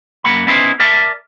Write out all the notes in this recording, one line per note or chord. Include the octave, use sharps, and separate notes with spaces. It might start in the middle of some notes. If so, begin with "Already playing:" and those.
F#2 F3 A#3 F#5 B5
B3 C#4 D#4 E4 B4 C5
A#4 D5 E5 A5